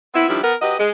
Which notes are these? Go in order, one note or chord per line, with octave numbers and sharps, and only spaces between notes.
B3 C4 E4
D#3 F3 G3 D4 E4
B3 A#4
F#3 G4 B4 D#5
G#3